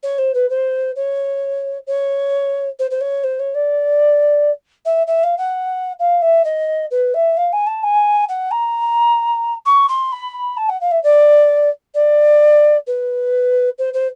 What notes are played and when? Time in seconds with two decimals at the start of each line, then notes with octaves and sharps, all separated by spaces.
0.03 C#5
0.18 C5
0.34 B4
0.50 C5
0.96 C#5
1.87 C#5
2.79 C5
2.91 C5
3.01 C#5
3.24 C5
3.40 C#5
3.55 D5
4.85 E5
5.07 E5
5.23 F5
5.38 F#5
5.99 F5
6.22 E5
6.45 D#5
6.91 B4
7.14 E5
7.37 F5
7.53 G#5
7.67 A5
7.83 G#5
8.29 F#5
8.51 A#5
9.66 C#6
9.89 C6
10.12 B5
10.57 A5
10.69 F#5
10.81 F5
10.91 E5
11.03 D5
11.94 D5
12.87 B4
13.78 C5
13.94 C5